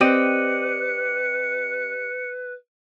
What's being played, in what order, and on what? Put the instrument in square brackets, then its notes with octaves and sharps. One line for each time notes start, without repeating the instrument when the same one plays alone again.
[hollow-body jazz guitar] C4 [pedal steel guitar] G4 D5 D#5 [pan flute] B4 [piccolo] C#7